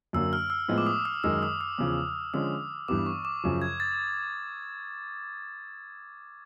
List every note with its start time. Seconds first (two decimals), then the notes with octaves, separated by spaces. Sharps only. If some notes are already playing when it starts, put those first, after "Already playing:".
0.13 F#2 D3 F#3 A#3 E6
0.33 F6
0.50 E6
0.68 A2 F3 G#3 B3
0.78 D6
0.87 D#6
1.05 E6
1.24 F#2 D#3 G#3 E6
1.43 D#6
1.61 E6
1.78 E2 C#3 F3
2.34 D3 F3 G#3 C#4 D#6
2.88 G2 E3 G3 B3 D6
3.06 C#6
3.25 D6
3.44 F#2 C#3 F3
3.62 G#6
3.80 A6